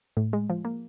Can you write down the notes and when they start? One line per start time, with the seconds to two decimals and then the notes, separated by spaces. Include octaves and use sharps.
0.17 A2
0.33 G#3
0.50 F3
0.65 A#3